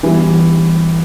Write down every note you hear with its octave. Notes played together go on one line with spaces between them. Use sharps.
E3 G3 B3